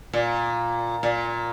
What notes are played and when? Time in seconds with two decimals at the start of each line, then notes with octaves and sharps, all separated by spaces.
0.13 A#2
1.03 A#2